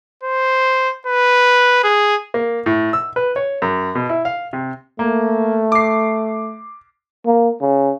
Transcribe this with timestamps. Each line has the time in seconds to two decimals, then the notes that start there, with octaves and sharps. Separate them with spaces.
0.23 C5
1.06 B4
1.84 G#4
2.34 A#3
2.66 A2
2.93 E6
3.16 B4
3.36 C#5
3.62 F#2
3.95 B2
4.09 E4
4.25 F5
4.53 C3
4.99 A3 A#3
5.72 D6 C7
7.26 A#3
7.62 C#3